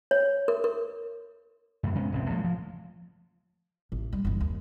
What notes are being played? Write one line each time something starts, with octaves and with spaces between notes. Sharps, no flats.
C#5
A#4
A#4
F#2 A2
C3 G#3 B3 C#4
E1 A1 G2 C4
A2 F3 F#3 G#3
F3
A1
G3 G#3
F#1 E3
D#2